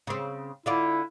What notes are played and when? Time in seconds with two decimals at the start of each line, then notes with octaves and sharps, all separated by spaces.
0.07 C#3 C4
0.66 D3 E4 F4 D5